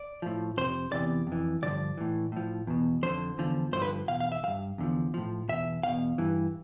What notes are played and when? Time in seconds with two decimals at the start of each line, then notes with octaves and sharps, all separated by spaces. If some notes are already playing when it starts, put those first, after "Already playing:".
Already playing: D5
0.22 A2 F3
0.57 F2 C3 F3 C5
0.92 E2 C3 E3 D5
1.27 F2 E3
1.62 G2 D3 F3 D5
1.97 A2 E3
2.32 A2 F3
2.67 E2 B2
3.03 F2 D3 F3 C5
3.38 E2 D3 F3
3.72 G2 D3 F3 C5
3.82 B4
4.08 E2 B2 F5
4.20 F5
4.32 E5
4.43 G2 E3 F5
4.78 E2 D3 F3
5.14 A2 F3
5.49 E2 B2 E5
5.83 E2 B2 F5
6.18 G2 E3